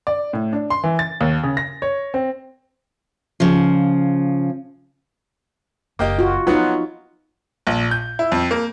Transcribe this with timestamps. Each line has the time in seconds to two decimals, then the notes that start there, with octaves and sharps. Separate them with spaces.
0.07 D5
0.33 A2
0.53 D4
0.70 C6
0.84 E3
0.99 A6
1.21 D#2
1.43 C#3
1.57 A#6
1.82 C#5
2.14 C4
3.40 C#3 F3
5.99 F#1 A#3 G4 D#5
6.19 F4 F#4
6.47 F3 F#3 B3 C4 D#4 F4 F#4
7.67 A#1
7.91 G6
8.19 E4
8.32 F2
8.51 A#3